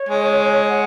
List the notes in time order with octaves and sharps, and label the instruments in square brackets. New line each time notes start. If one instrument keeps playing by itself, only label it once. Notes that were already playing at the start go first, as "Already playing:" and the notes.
Already playing: [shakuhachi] C#5
[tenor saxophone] G#3
[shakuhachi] F#5